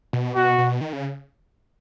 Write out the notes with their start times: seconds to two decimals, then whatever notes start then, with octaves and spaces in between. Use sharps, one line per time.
0.13 B2
0.35 B2 F#4
0.58 B2
0.81 D#3
0.93 C#3